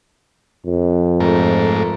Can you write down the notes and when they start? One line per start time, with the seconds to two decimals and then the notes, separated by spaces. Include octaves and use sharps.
0.66 F2
1.20 G#2 A3 A#4